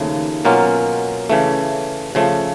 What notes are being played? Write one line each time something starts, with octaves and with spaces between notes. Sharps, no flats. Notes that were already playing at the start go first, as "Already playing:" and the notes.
Already playing: D#2 C#3 F3 A3
B2 F#3 A#3 C#4 F4
C#3 E3 A3
C#3 F3 A3